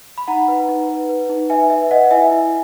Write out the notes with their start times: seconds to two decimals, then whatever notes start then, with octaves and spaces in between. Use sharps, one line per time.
0.18 B5
0.28 D#4 F#5 A#5
0.48 B4
0.69 D#4
0.89 B4
1.09 B4
1.30 D#4
1.50 B4 E5 G#5
1.70 B4 E5
1.91 B4 D#5 F#5
2.11 E4 E5 G#5
2.31 E4